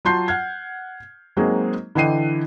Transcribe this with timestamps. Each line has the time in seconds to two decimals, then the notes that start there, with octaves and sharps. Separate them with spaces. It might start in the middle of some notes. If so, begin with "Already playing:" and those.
0.05 F#3 F4 A5 C6 G6 C7
0.28 F#5 F6 G#6
1.37 F#3 G#3 A#3 C4 D#4 G#4
1.95 D3 E3 D#5 G5 C7 D#7